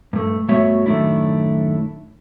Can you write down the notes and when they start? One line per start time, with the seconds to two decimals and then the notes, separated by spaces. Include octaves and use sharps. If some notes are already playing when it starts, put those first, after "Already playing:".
0.13 G2 A3
0.48 G2 A3 B3 F#4 C#5 E5
0.86 F#2 A2 D#3 A3 D4 E4